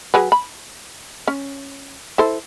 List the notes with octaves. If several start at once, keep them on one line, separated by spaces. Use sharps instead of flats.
F#3 G#4 B4
B5
C#4
E4 A4 C5